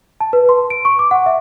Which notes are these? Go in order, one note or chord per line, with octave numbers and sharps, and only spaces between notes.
A5
B4
C6
D7
C#6
D6
F#5
E5